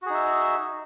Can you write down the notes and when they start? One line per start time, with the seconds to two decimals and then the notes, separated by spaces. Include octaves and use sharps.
0.02 F#4
0.06 G#4
0.10 D#4
0.14 E5